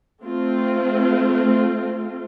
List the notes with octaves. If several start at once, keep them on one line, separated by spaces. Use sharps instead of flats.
A3 C4 F4